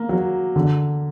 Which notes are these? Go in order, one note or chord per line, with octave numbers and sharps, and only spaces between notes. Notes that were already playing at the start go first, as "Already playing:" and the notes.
Already playing: A#3
F#3
D3